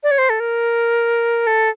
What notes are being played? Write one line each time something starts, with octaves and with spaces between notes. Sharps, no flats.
D5
C#5
C5
A4
A#4
A4